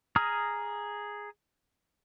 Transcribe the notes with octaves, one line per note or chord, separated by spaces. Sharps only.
G#4 A#5 D#6 F6